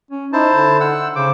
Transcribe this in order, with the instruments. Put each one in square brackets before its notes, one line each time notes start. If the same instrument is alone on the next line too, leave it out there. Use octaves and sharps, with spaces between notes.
[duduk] C#4
[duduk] D#4 [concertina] E4 C5 A5
[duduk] D3
[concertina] F#5 E6
[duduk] C#3 [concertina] C5 D6